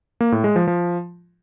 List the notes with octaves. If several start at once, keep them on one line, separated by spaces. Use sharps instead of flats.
A#3
A2
G#3
F3
F3